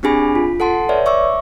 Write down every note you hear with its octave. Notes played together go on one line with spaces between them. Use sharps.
C4 D4 G4 G#4 G#5 B5
F4
A4 F#5 A5 C6
B4 C#5 D5 E5
E5 C#6 D6 E6